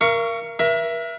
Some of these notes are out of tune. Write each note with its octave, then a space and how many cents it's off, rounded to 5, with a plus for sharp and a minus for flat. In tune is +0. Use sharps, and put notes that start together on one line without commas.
A#4 +0 F5 -40 C#6 +15
A#4 +45 E5 +20